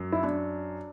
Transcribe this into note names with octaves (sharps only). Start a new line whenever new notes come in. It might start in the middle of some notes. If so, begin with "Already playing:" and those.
Already playing: F#2
E4
D4